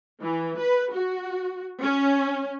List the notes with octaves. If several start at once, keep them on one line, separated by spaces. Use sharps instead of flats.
E3
B4
F#4
C#4